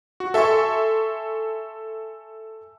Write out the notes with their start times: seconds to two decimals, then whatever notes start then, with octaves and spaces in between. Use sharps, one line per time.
0.20 F#4
0.34 A4 E5 G#5 C6 C#6